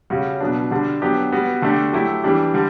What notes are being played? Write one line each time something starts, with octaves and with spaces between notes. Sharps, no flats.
C#3 G3 C#4 F#4
B2 F#3 B3 D4
D3 G3 D4
F#3 B3 D4 G4
G3 B3 F#4
D3 A3 D4 G4
F#3 A3 E4 G4
E3 G3 D4 G4
D3 G3